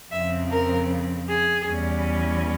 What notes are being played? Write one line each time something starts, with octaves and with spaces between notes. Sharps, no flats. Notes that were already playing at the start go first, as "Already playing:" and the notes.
F2 C#3 F3 C4 E5
A#4
G#4
E2 E3 G3 C#4